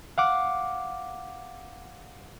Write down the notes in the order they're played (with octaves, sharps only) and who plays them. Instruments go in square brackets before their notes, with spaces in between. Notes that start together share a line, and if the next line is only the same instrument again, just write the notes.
[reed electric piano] F5 F#5 D6